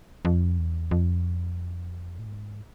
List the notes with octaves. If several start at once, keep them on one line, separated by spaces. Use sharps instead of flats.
F2
E2
F2
A2
G#2